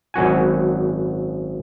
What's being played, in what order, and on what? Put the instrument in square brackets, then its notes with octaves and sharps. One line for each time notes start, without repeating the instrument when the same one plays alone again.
[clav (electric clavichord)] G#1 F#2 F#4 G#5